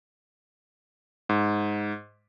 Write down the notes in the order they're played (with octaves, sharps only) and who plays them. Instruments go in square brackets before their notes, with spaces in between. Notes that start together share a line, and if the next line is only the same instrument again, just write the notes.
[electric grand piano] G#2